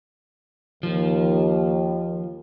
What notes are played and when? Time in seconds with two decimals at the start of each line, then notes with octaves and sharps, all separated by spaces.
0.83 D#2 F3